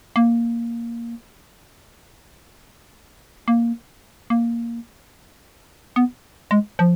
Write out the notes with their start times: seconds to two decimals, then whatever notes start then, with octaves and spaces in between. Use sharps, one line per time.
0.16 A#3
3.48 A#3
4.30 A#3
5.96 B3
6.51 G#3
6.79 F3